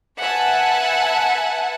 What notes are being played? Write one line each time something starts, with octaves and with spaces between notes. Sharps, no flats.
B4 E5 F#5 G#5 A5